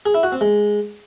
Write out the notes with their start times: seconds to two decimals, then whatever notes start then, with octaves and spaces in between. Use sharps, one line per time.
0.06 G#4
0.14 E4
0.23 F#4
0.32 C4
0.41 G#3